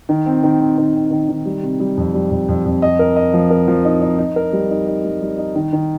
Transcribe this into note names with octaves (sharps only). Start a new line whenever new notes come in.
D#3
C4
D#3
C4
D#3
C4
D#3
D#3
G3
C3
G3
F2
G3
F2
F2
F2
D#5
A#4
D#5
F3
A#4
F3
D#4
D#4
D#4
A#4
G3
D#4
D#4
G3
G3
D#4
D#3
D#3